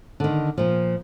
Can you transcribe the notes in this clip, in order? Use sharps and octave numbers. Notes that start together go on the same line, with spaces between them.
D3 D#3
A#2 F3